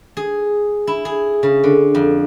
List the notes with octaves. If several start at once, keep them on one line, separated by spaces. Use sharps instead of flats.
G#4
E4
G#4
C#3
D3
F2